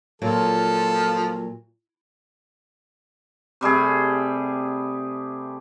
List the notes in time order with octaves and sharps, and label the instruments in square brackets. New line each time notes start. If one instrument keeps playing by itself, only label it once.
[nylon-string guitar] A#2 F#3 [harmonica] F3 F4 A4
[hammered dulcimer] C3 G3 A3 G#4